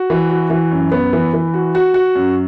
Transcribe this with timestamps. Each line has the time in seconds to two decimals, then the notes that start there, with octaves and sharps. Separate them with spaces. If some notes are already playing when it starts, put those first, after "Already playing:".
Already playing: F#4
0.10 E3
0.30 F#4
0.50 E3
0.71 F#2
0.92 B3
1.13 E3
1.33 E3
1.54 F#4
1.75 F#4
1.94 F#4
2.15 F#2